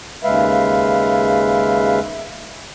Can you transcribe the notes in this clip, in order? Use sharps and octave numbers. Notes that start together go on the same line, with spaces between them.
D#2 C#3 G#3 B4 E5 F5